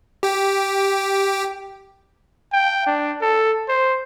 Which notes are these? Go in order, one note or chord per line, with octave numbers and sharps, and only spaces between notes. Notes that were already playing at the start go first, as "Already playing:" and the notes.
G4 G5
G5
D4
A4
C5